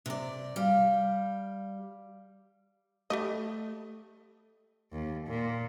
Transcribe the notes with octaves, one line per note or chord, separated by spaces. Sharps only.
C3 D5
G3 F5
G3 A3 G4 D#5
D#2
A#2